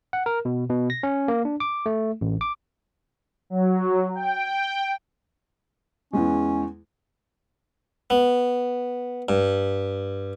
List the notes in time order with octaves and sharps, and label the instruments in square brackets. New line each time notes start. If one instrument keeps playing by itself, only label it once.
[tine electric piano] F#5
A#4
B2
B2
A#6
C#4
A#3
D4
D6
A3
A1
D6
[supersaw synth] F#3
G5
[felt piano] E2 G#3 [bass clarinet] C#4
[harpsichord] B3
G2